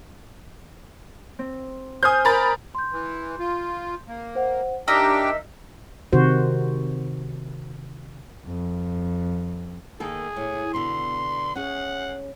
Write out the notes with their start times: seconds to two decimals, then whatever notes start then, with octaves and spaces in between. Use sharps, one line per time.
1.39 C4
2.03 C5 G#5 D#6 F6 G6
2.25 A#4 B5 A6
2.75 C6 G6
2.92 E3
3.39 F4
4.08 A#3
4.35 C5 F#5
4.88 D4 D#4 G4 A#4 E5 G5 F6
6.13 C3 D#3 F#4 C5
8.45 F2
10.00 D#3 A#3 G#4 A4
10.36 A2
10.74 B2 D3 C6
11.56 C#4 G#4 F#5